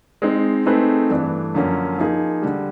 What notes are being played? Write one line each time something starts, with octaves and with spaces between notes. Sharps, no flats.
G#3 C4 D#4
A3 C4 D#4 G#4 B4
G2 E3 A3 D4
F#2 D3 F3 A#3 C#4
F3 A#3 D#4 G#4
D3 G3